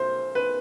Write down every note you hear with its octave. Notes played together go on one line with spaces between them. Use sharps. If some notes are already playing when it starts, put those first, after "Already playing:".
Already playing: B1 A3 C5
B4